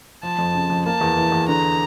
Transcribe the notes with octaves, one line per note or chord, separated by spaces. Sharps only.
F3 A5
F2
C#3
F2
A#3 A5
E2
E3
E2
D3 A#5